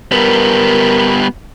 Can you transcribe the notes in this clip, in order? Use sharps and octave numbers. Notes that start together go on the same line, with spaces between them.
F#2 G3 B3 A#4